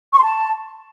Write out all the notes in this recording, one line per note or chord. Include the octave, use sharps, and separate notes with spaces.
C#6
C6
A5